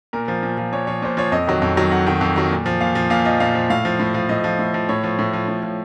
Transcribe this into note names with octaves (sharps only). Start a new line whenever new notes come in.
A#2 A#4
F3
A#2
F3
A#2 C#5
F3 C#5
A#2 C5
F3 C#5
F2 D#5
D#3 F#3
F2
D#3 F#3
F2 F#5
D#3 F#3
F2
D#3 F#3
A#2
F3
A#2 F5
F3
A#2 F5
F3 D#5
A#2 F5
F3
A2 F5
F3
A2
F3
A2 D#5
F3
A2
F3
A2 C#5
F3
A2
F3
A2
F3